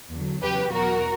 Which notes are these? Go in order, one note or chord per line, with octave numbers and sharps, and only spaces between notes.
E2 D3 F#3
E2 C#3 F#3 G4 B4
E2 B2 F#3 F#4 A#4